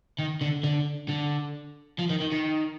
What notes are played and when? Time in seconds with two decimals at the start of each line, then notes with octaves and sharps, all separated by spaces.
0.19 D#3
0.41 D3
0.64 D3
1.09 D3
1.99 F3
2.10 D#3
2.21 D#3
2.32 D#3